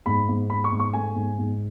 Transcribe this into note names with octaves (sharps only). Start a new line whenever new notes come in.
G#2 B5
G#2
G#2 B5
C#6
G#2
C#6
A3 G#5
G#2
G#2